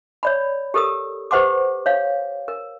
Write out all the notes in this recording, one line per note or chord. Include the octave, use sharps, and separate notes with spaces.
C#5 D5 B5
G4 A4 A#4 D#6
G4 B4 C5 F#5 C6 D6
C#5 F5
A#4